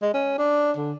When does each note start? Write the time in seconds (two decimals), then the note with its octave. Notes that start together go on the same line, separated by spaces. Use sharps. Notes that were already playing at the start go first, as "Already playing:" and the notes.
0.02 G#3
0.14 C#4
0.38 D4
0.77 D3